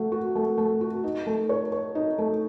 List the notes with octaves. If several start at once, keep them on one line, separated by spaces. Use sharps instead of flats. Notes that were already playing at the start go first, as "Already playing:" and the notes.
Already playing: A3 F#4
F#4
A3
A3
F#4
D#4
A3
C#5
C#5
D#4
A3